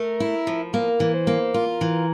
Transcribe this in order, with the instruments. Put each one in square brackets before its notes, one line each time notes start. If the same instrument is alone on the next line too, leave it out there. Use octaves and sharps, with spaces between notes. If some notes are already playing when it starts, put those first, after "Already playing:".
Already playing: [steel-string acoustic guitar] A3 [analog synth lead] A#4
[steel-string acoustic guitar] E4
F3
[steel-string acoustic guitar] A#3 [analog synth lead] A#4
[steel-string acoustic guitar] E3
[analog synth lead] C5
[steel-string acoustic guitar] A#3
[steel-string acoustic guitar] F4 [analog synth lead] A#4
[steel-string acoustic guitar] E3